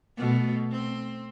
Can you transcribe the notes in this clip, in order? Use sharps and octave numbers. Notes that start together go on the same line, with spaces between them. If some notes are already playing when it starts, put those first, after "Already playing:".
B2 A3
C4